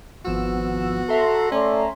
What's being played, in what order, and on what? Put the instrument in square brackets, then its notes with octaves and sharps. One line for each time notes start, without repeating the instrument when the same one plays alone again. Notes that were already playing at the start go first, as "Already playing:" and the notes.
[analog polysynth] G#1 F3 E6 [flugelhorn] B3 [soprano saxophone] F#4
[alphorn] A4 [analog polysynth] E5 A#5 C6
[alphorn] A3 [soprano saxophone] C#4 [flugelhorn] D5